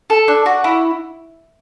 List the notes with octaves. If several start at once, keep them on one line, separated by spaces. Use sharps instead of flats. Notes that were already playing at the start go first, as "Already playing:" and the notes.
A4
D4
F#4
E4